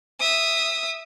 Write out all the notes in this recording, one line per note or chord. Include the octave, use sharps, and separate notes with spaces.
E5 D#6